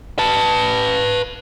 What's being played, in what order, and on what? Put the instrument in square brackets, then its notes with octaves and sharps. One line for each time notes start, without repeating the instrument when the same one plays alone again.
[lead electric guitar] B4 A5